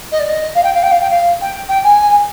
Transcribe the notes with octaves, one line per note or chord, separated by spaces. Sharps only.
D#5
D5
D#5
F5
G5
F5
G5
F5
G5
F5
G5
G5
G#5